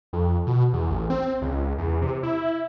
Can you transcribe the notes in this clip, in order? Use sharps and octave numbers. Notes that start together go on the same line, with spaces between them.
F2
B2
E2
A1
C4
C#2
E2
C3
E4